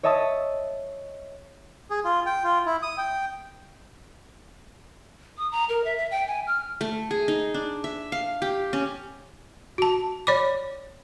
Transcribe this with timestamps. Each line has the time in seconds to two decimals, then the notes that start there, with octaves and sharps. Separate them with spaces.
0.03 C#5 D#5 E5 A5 D#6
1.90 G#4
2.04 F4
2.26 G5
2.44 F4
2.66 E4
2.82 D#6
2.98 G5
5.38 D#6
5.52 A#5
5.69 A#4
5.84 E5
5.97 E5
6.11 G5
6.27 G#5
6.47 F6
6.81 A3
7.11 G#4
7.28 D#4
7.54 D4
7.84 E5
8.12 F5
8.42 G4
8.73 C#4
9.78 F#4 A5
10.27 C#5 D5 B5 D6